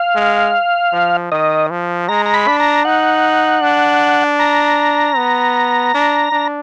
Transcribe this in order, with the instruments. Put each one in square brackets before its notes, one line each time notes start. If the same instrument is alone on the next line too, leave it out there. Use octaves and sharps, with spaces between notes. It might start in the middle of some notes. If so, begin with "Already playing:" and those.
Already playing: [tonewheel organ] F5
[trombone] G#3
F3
[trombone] D#3 [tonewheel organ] D#5
[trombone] F3
[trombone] G#3 [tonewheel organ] A#5
[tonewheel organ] A#5
B5
[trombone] D4
[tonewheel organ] A#5
[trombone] D#4 [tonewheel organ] F#5
[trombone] D4
[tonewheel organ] A#5
[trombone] B3
D4
D4